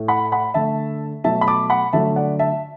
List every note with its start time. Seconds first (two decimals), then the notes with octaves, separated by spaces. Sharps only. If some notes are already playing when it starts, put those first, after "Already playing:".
Already playing: A2 A3
0.08 F#5 B5
0.32 F#5 B5
0.54 D3 A3 E5 A5
1.24 B2 F#3 A3 E5 A5
1.41 B5
1.47 A5 D6
1.70 F#5 B5
1.93 D3 F#3 A3 E5 A5
2.16 D5 F#5
2.39 E5 A5